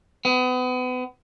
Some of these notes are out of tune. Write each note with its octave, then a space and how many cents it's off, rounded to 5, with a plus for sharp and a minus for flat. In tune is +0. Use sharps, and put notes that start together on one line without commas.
B3 +35